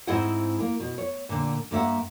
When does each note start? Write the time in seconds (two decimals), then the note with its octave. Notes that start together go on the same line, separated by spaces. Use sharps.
0.07 G#2 C4 E4 G#4 D#5 F#5
0.60 A#3
0.80 B2
0.98 C#5
1.29 A#2 D3
1.71 G2 A#3 E5 F#5